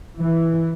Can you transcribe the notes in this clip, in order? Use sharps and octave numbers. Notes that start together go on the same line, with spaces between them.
E3